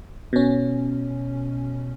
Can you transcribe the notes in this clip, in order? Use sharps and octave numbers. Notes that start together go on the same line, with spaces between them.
B2 C#4